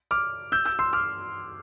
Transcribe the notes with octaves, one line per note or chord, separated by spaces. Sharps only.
D6 F6
E6 G6
E6 G6
C6 E6
D6 F6